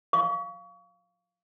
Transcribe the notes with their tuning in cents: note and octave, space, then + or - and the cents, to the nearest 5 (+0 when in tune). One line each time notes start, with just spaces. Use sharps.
F5 +0 C#6 +30